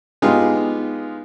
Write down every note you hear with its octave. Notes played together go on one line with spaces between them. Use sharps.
G#3 B3 D#4 F4 G4 G#4